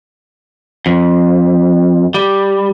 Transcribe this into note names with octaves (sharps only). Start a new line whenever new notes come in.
F2
G3